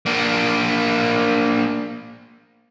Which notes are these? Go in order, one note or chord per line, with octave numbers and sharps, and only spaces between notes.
A#3 D4